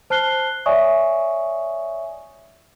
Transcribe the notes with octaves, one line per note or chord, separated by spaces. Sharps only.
C5 A5 F6 F#6 C7 G7
C#5 D5 E5 G#5 C#6 D#6